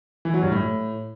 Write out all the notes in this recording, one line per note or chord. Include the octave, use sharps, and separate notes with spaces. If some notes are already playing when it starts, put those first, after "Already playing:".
E3
F#3
G2
A2